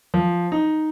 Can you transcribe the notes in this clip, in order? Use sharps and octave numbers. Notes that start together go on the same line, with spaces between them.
F3
D#4